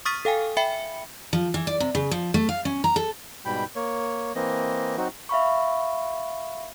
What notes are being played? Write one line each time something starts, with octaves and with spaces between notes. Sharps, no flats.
C#6 D#6 F6 A6 B6 D#7
A4 F5 G5 G#5
E5 G5 B5 C#7
F3
E3
D5
C3
C#3
F3
A3
F5
C#4
A#5
A4
G#2 B2 G3 G5 B5
A#3 C#5
E3 A#3 C4 D#5
F#3 C4 D#4 F#4
E5 F5 B5 C#6